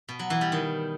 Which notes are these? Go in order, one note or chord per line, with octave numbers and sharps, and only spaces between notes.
B2
F#3
E3
G3
D#3